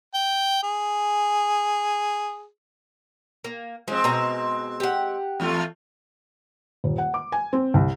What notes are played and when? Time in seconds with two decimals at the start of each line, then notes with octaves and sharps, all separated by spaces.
0.14 G5
0.63 G#4
3.44 A#3
3.88 F3 G#3 C4
4.04 B2 A#5
4.80 G4 F#5
5.40 E2 A3 F4
6.84 D#1
6.98 F#5
7.14 D6
7.32 G#5
7.53 C4
7.74 C2